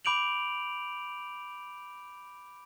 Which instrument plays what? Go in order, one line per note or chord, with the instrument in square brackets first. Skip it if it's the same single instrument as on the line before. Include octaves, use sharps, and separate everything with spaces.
[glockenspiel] B5 D6 G6 D7 F7 F#7